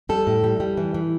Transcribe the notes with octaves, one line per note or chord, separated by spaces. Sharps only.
G3 A4
A2
G3
G3
E3
E3